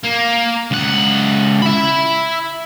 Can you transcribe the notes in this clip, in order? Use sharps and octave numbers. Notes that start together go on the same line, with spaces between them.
A#3
C#2 F#5
E5 B5